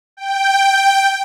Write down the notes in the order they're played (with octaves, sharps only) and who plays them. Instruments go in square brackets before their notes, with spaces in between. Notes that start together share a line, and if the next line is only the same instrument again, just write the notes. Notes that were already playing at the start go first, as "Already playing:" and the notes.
[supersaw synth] G5